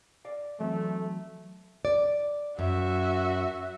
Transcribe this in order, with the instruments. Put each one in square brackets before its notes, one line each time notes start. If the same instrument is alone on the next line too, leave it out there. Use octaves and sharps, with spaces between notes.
[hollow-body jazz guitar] D5 F5
[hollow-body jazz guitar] E3 F#3 C4 [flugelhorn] A3
[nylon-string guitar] D5
[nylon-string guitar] F#2 [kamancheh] F#4 E5